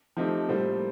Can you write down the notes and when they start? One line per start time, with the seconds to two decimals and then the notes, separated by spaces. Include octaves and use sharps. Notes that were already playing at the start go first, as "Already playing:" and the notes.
0.17 F3 A3 C4 D#4 G4
0.48 A2 G3 A#3 F4 C5